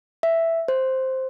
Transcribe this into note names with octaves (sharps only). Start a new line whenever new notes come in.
E5
C5